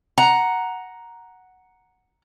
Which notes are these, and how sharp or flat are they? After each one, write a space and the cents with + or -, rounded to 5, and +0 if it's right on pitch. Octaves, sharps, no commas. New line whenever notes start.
F#5 +0 A#5 +5